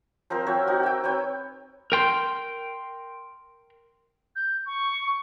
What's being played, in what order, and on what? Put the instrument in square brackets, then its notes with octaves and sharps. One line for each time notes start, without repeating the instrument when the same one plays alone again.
[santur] F3 C4 A#4 C5
C4 F#4 C#5 E5
D#4 F#4
E5 G5
C4 B4 C#5 G5
[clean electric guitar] A#4 G5 C6
[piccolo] G6
C#6